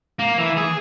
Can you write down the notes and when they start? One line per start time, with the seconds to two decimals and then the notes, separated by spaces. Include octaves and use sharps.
0.19 A#3
0.38 E3
0.57 G#4